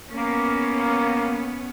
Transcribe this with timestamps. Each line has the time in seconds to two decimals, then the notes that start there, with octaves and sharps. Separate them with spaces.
0.11 A#3 B3 C#4